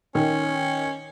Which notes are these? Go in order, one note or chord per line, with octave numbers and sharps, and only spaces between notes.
D#3 C#4